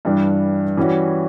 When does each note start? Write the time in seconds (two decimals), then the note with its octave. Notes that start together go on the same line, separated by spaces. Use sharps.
0.05 G2 E3 G3 D4
0.77 E3 G3 C#4 F#4